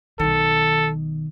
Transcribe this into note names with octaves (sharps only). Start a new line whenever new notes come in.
B1 D#3 A4